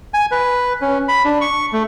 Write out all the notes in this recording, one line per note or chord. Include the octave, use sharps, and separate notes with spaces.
G#5
B4
C#4
B5
D4
C#6
A3